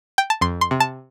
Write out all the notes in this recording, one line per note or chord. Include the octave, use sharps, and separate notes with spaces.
G5
A5
F2 C6
C6
C3
A5